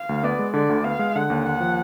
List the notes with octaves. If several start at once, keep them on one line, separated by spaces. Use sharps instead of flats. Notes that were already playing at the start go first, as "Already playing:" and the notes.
Already playing: F5
D2
B3 D5
G#3
D3 D5
D2
B3 F5
G#3
D3 F#5
D#2
D#2 F#5
F3